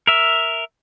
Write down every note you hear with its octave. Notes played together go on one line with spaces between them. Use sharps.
A#4 E5